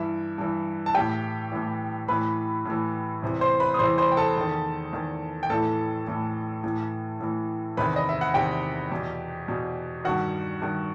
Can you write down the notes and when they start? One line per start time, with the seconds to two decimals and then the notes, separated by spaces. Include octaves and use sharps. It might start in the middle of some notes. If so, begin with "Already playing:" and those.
Already playing: G2 E3 E4 E5
0.38 G2 E3
0.86 A5
0.95 A2 E3 G4 G5
1.52 A2 E3
2.08 A2 E3 B4 B5
2.65 A2 E3
3.22 E2 C3 E3
3.41 C5 C6
3.60 B4 B5
3.74 D#6
3.79 E2 C3 E3 C5 C6
3.98 C5 C6
4.12 G5
4.17 A4 A5
4.36 E2 D#3
4.93 E2 D#3
5.43 G5
5.50 A2 E3 A4 A5
6.07 A2 E3
6.64 A2 E3
7.20 A2 E3
7.77 E2 C3 D#3 B4 B5
7.96 D#5
8.09 E5
8.21 F#5
8.34 E2 C3 D#3 G4 G5
8.91 E2 B2
9.48 E2 B2
10.04 G2 D#3 F#4 F#5
10.62 G2 D#3